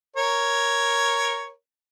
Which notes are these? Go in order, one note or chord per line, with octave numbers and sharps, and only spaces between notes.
A#4 C#5